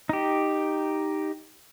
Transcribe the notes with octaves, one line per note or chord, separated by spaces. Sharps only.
D#4 G4